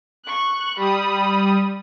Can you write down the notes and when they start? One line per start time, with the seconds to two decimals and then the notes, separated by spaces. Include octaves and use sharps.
0.24 C#6 F#6
0.77 G3 B5 D#6